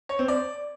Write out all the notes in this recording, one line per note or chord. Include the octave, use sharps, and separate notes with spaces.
C#5
C4
D5